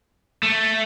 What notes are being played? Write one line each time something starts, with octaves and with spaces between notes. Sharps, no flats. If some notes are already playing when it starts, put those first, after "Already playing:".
A3